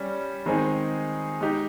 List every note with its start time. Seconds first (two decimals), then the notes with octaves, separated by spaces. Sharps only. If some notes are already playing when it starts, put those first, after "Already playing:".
Already playing: G3 C#4
0.46 D#3 G#3 C4 D#4 G#4
1.41 G#3 D#4 G4